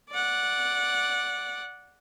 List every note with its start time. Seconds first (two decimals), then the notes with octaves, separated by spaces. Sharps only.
0.11 D5 F#5